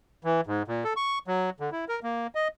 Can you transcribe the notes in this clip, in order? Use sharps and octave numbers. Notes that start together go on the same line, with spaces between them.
E3
G#2
A#2
A4
C#6
F#3
D3
E4
A#4
A#3
D#5